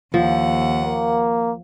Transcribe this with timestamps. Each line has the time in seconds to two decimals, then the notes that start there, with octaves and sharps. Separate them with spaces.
0.14 D#2 F3 F#5
0.83 A#3